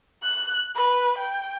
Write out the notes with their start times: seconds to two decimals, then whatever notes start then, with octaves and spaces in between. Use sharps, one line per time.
0.22 F#6
0.75 B4
1.18 G5